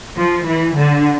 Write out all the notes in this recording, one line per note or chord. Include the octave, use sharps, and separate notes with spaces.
F3
E3
D3